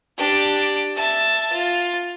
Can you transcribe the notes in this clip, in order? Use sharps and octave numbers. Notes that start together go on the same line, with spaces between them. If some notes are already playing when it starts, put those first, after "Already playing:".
D4 G4
E5 A5
F4